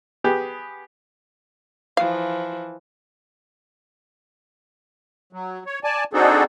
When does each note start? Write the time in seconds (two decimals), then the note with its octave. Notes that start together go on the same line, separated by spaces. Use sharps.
0.24 B3 G4 G#4
1.97 E3 F3 F5
5.33 F#3
5.66 C#5
5.84 D5 G#5 A5
6.13 C4 D4 D#4 F#4 G#4 A4